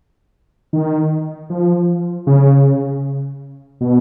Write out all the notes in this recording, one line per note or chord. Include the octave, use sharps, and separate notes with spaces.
D#3
F3
C#3
B2